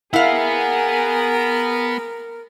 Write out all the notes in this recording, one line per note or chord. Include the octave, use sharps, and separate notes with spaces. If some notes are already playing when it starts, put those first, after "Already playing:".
B3 E4 G#4 A#4 F5 F#5